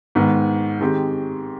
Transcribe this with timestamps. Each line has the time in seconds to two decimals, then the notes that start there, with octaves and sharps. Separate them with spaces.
0.15 G#2 D#3 B3
0.80 D#3 G#3 C4 G4